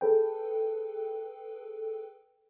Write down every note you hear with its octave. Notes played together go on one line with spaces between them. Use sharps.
G#4 A4 B4 G5